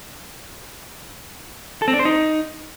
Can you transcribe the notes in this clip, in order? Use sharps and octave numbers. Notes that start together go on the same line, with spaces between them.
A4
C4
D4
C5
D#4